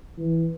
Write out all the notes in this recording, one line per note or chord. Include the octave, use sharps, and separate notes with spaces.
E3